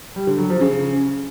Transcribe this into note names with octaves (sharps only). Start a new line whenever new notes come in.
G3
D3
F#3
F3
C#3